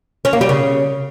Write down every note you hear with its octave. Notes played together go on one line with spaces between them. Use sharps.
C#4
A#3
G3
C#3